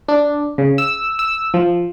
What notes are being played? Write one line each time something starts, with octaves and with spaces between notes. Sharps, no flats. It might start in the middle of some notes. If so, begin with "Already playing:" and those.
D4
C#3
E6
E6
F3